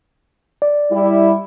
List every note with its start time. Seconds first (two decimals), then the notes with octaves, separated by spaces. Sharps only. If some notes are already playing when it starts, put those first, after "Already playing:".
0.62 D5
0.92 G3 E4